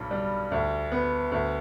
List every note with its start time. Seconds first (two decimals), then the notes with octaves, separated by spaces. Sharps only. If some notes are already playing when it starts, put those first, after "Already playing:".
Already playing: B1 G2
0.11 G3
0.52 D2
0.92 B3
1.32 D2